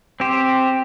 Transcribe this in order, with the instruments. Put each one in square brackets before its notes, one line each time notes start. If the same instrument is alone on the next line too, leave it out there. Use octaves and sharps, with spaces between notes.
[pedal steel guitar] C4 G4 C5